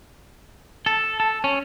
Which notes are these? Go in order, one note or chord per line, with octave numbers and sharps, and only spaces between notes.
A4
A4
C#4